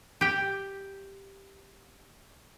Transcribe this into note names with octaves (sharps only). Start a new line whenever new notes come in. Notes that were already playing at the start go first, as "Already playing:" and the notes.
G4 G5